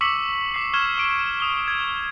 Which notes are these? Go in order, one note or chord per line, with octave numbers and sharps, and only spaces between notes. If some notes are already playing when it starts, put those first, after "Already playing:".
C#6 D6 E6 B6 C#7 F#7
D6 B6 C7
C#6 F6 G#6 E7
D6 D7
D#6 G7
G#6